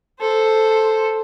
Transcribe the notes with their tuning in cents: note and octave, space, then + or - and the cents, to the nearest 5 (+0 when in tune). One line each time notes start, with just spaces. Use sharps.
A4 +0 C5 +0